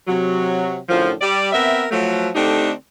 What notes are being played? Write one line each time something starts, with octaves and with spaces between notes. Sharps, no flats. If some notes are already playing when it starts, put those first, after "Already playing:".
C3 F#3
F#2 A2 D3 F3
G3 D5
B3 C4 A#4 E5
F3 F#3 A3
D3 A3 C4 D4 D#4 G4